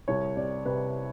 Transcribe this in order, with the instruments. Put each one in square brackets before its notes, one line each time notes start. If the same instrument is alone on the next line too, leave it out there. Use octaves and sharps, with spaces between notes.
[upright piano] C2 C#5
C3 D5
C3 B4